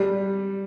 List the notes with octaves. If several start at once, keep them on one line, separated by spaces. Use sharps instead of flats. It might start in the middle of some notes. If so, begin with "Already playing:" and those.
Already playing: G3